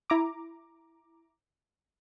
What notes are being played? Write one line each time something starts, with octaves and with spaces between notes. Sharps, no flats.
E4 A#5 D6